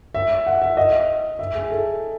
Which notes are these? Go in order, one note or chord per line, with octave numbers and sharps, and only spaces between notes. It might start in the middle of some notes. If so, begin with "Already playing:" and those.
E5
F#5
E5
D#5
E5
G#4
A4